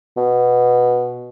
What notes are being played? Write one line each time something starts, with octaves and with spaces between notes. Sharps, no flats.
B2